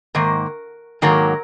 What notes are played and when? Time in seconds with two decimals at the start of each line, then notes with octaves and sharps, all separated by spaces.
0.15 G#2 D#3 A#3 A#4
1.02 G#2 D#3 F#3 A#3 A#4